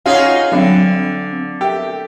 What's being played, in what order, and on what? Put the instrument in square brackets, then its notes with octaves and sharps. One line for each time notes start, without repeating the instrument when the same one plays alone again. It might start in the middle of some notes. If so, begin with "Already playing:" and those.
[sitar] C#4 D#4 G#4 [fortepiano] F4 [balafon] C#5 F#5
[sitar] D3 [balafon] F#3 G3 D4 [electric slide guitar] C4 A4
[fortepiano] G4 [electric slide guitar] A4 A#4 E5